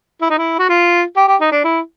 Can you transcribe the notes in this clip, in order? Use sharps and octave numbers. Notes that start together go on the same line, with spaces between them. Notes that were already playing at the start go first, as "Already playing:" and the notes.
E4
D#4
E4
F#4
F4
G4
G4
D#4
D4
E4